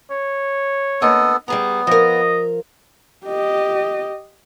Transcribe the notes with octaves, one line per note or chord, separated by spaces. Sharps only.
C#5
D2 A#3 B3 A4 D#5
G3 B3 G#4 A#5
F3 A#4 D#5
G4 D#5